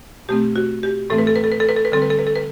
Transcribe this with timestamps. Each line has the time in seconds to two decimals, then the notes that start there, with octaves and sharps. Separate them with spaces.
0.29 B2 A3 C4 G4
0.56 F#4
0.83 G4
1.10 A2 E3 A3 C4 A4
1.18 B4
1.27 A4
1.36 B4
1.44 A4
1.52 B4
1.60 A4
1.69 B4
1.76 A4
1.85 B4
1.92 D3 G3 C4 A4
2.02 B4
2.10 A4
2.19 B4
2.27 A4
2.36 B4